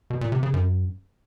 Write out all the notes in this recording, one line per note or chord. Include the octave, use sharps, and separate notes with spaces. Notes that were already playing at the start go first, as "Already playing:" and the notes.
B2
A#2
C3
C#3
F#2